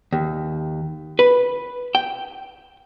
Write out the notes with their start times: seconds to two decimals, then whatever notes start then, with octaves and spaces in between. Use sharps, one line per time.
0.12 D#2
1.19 B4
1.95 G5